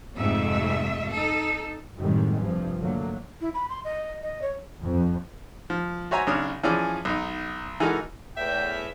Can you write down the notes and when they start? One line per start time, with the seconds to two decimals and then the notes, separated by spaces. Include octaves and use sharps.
0.16 F2 G#2 C3 A3 E5
1.09 D#4 A4
1.97 F#2 A2 C3 D#3 G3 G#3
2.40 F1 G2 C3 F3
2.81 D3 F#3 A3 A#3
3.41 E4
3.54 B5
3.69 C6
3.84 D#5
4.22 D#5
4.42 C#5
4.82 F2
5.70 F3
6.11 F#4 C5 C#5 E5 G#5 A#5
6.27 B1 C#3 D4 C#5 D#6 F6
6.64 E3 F3 C#4 G#4 D5
7.05 B1 D#4
7.80 E3 G#3 D#4 F#4 A4 A#4
8.37 E2 A2 E5 G5